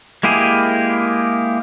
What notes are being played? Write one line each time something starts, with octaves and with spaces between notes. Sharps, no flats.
G#3 A#3 E4 G4 G#4